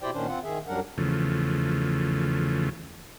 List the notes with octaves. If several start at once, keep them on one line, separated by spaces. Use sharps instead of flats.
B2 E4 G4 C5 D5 G5
A#2 D#3 C#4 D4 C5
C4 F4 F#5
D#3 G#4 E5
F#2 F#3 G3 D4 A#4 F#5
E2 C#3 F3 A3